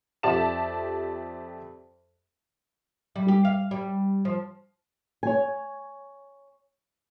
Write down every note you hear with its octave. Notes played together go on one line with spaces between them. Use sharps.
F2 G4 D5 E5 A5 E7
G3
G4
F5
G3
F3
C#5 G#5